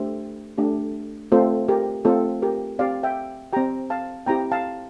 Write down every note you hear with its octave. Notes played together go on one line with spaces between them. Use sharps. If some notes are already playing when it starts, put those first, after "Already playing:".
Already playing: A3 D4 G4 C5 E5
A3 D4 G4
A3 C4 F4 A4 C5
G4 A#4
A3 C4 F4 A4
G4 A#4
C4 G4 D5 F5
E5 G5
C4 G4 G5 A#5
F5 A5
C4 E4 G4 G5 A#5
F5 A5